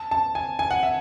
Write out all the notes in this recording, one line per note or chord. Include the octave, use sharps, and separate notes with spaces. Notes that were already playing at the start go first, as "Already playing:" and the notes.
Already playing: A5
A5
G#5
G#5
F#5
E5